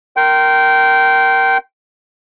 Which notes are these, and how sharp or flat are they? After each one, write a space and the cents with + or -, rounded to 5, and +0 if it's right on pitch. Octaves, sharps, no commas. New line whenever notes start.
A#4 +0 G5 -20 C6 +0